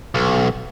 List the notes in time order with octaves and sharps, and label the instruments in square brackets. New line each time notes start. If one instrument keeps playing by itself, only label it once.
[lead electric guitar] B1